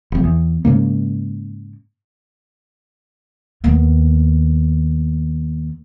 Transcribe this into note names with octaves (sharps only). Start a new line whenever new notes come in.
F1 F2
E2
G#2 C#3 A#3
D#2 B3